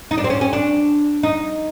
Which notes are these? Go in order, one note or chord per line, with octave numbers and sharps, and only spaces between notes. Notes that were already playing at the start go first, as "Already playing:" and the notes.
D#4
D4
C4
C#4
C#4
D4
D#4